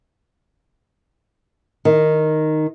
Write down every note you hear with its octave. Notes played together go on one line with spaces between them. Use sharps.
D#3